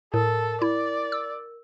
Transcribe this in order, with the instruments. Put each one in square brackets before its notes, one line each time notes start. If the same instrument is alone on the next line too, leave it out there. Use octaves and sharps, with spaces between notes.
[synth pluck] A2 [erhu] A4 [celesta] A#4
[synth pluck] E4 [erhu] D5
[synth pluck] E6